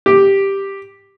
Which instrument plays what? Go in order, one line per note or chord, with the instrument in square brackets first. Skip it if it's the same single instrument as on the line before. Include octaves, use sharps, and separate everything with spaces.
[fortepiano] G4